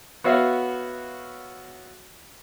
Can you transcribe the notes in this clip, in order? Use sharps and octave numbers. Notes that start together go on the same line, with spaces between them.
B3 F#4 C#5 E5 F5